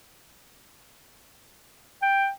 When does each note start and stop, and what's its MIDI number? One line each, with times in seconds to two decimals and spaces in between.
2.02 2.30 79